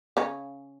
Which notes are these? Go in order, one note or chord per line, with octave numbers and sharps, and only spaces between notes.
C#3 C#4